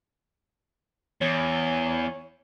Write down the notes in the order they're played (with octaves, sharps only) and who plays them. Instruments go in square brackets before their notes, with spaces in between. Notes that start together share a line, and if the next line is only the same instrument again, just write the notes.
[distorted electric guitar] E2 [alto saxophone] C#5